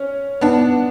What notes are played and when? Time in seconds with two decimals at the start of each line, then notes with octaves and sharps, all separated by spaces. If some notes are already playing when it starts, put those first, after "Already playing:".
Already playing: C#4
0.41 B3 D4